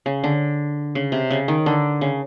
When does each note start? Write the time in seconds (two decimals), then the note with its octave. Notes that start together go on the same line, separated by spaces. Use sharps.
0.06 C#3
0.24 D3
0.95 C#3
1.12 C3
1.31 C#3
1.48 D#3
1.66 D3
2.01 C#3